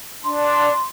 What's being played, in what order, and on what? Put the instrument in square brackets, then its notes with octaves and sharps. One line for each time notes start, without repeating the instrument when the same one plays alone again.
[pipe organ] D4 [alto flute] C6